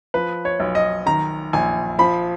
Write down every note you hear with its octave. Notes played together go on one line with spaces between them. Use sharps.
F3 B4
C#5
B1
D#5
D#3 A#5
A#1 G#5
F3 B5